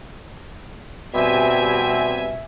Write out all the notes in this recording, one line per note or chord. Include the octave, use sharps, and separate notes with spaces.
B2 G3 C4 E5 G#5